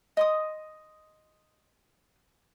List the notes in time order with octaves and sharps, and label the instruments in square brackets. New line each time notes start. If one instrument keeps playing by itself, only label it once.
[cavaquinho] D#5 C6 D#6